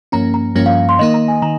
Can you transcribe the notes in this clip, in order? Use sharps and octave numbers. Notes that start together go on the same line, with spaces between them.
G2 F3 A#3 C#4 A#5
A#5
G2 F3 A#3 C#4
F5
C6
D#3 A#3 D#4 D#5
A#5
G#5
D#3 A#5